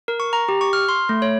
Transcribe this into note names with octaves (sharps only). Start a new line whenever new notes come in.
A#4
C#6
A#5
G4
C#6
F6
C6
A3
C#5